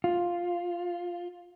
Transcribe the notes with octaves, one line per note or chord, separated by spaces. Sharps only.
F4